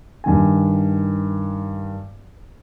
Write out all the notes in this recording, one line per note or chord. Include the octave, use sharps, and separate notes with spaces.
G2 D#3 G#5